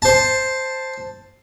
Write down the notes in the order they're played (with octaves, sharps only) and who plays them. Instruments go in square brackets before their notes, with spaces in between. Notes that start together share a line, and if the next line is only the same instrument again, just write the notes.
[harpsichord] C5 A5